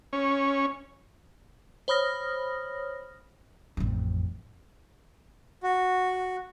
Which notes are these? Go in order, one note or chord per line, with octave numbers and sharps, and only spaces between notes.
C#4
C5 C#5 B5 D#6 F6 A#6
A1 F2
F#4